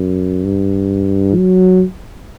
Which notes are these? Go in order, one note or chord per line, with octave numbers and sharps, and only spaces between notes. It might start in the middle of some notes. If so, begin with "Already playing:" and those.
Already playing: F#2
G2
F#3